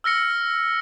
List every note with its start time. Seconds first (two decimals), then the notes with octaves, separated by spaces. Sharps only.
0.04 E6 F6 A#6 C#7